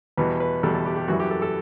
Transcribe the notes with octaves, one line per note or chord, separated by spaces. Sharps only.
E2 B2 G3 B4
B4
E2 B2 G3 A4
A4
G4
G4
F#2 E3 G3 F#4
G4
A4
A4